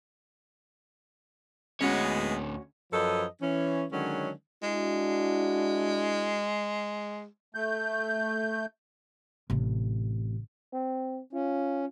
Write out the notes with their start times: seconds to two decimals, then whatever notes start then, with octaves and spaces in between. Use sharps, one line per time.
1.81 D2 G#3 B3 C#4 F#4 C#5
2.92 F#2 F3 A4 B4 D#5
3.42 E3 C#4
3.92 D3 D#3 F#3 G#3 C#4
4.63 G#3 D4 E4 F#4
7.55 A3 G6
9.50 A1 C3
10.73 C4
11.33 C#4 F4